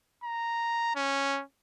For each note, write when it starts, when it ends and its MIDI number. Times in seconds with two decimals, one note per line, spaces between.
0.24 0.94 82
0.96 1.41 61